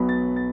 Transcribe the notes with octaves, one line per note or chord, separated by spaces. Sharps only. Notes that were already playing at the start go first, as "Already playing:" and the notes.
Already playing: B1 B2 F#3 B3 B5
A6
A6